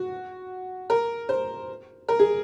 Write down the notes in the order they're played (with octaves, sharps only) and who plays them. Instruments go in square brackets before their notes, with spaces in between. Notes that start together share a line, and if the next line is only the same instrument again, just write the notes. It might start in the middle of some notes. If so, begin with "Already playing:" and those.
Already playing: [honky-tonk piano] F#4
A#4
C5
A#4
G#4